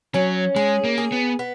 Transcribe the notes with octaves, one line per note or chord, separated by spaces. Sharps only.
F#3 C#4
G#3 G#4
A#3
G#4
B3
B3